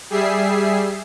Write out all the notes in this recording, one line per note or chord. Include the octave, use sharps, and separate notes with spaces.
G3 G#4 E5 C7